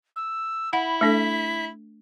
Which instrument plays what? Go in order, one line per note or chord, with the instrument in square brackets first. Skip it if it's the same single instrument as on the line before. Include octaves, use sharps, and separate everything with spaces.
[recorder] E6
[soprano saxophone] E4 [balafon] F#5 [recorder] B5
[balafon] A3 D4 A4 [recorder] B6